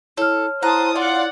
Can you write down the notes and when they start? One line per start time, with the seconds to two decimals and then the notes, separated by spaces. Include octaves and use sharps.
0.17 E4 A4 C#5 F6
0.63 E4 C5 F#5 A5 A#5 D#6
0.95 F4 D5 F#5